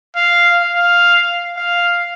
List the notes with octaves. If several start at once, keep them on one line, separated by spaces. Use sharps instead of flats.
F5
F5
F5